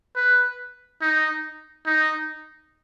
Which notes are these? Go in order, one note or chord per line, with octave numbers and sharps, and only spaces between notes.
B4
D#4
D#4